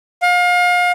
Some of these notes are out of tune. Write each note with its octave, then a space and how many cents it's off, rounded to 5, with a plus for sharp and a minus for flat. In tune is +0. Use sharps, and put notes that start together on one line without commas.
F5 +35